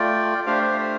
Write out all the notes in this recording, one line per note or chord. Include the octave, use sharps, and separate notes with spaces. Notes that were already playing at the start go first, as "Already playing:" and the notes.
Already playing: A3 F4 D5 G5
A3 D4 G4 C5 F5
C5 F5
C5